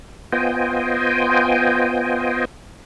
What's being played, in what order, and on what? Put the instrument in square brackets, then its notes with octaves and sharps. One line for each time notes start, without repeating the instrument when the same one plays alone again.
[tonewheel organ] B3 F4 C5 D#5 G5 G#5